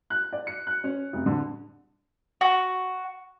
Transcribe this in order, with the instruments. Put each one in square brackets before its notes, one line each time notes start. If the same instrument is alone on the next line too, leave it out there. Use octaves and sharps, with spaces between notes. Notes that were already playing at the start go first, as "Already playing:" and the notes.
[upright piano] F#6
D5
C#7
F#6
C#4
F1
D3
[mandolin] F#4